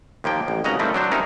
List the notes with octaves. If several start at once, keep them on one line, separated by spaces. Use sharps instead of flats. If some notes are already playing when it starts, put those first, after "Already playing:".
D#2 F3 A#3 G5
A1
G#1 C#3 C#4 D#5 F#5 A#5
D#3 F3 G3 A3 C4 E4
F#3 D4 C5
C3 C#4 D#4 E4 A#4